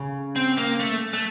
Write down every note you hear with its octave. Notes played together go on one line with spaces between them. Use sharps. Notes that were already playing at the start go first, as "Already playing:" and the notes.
Already playing: C#3
C4
A#3
A3
A3